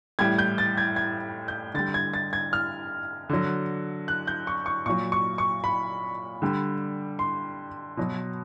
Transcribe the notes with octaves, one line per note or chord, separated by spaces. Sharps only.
A2 E3 G3 G#6
G6
A6
G#6
G#6
G6
D3 G3 A6
G#6
A6
G#6
F6
D3 F#3
F#6
G6
C#6
C#6
A#2 F#3 C#6
C#6
C#6
B5
D3 G3
C6
B2 F#3